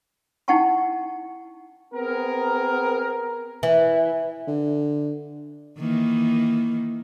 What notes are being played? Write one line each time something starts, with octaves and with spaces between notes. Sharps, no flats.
D#4 E4 F#5 G5 A5 C#6
B3 C4 G#4 A#4
E3
D3
D#3 E3 A#3